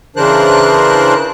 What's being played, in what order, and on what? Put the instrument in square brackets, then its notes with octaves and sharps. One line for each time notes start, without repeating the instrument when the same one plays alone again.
[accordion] C#3 E3 D4 A#4 C5 F#6